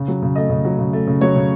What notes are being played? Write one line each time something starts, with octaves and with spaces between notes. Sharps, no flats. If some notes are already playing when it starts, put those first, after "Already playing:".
Already playing: C#3
F#3
C#3
A3 D#5
C#3
F#3
C#3
A3
C#3
F#3 C#5
C#3